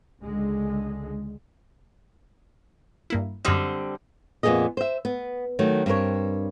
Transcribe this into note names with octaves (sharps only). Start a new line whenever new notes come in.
C#2 D3 G#3
G2 A#3 E4
F#2 D3 G3 C4 D#5
F2 A#2 C#3 B3 G#4 D#5
C5 E5
B3
D#3 F#3 A3
G2 C4 F4 A#4 C#5